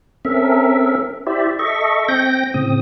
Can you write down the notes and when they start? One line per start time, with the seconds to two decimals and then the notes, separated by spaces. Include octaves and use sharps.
0.25 C4 C#4 A4 A#4 E5
1.27 E4 G4 C5 D5 E5
1.59 A4 D#5 E5 C#6
2.08 C4 G5 G6 A#6
2.54 A2 C#3 C4 D#6